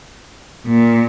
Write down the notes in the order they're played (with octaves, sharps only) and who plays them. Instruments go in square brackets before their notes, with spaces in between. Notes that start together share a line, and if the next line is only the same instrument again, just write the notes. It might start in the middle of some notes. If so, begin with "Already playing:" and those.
[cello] A#2